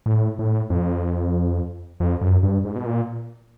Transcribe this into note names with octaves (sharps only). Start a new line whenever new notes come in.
A2
A2
F2
F2
F#2
G2
G#2
B2
A#2